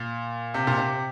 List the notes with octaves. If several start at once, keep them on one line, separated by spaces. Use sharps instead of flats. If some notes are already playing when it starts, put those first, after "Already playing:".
Already playing: A#2
C3
A#2
C3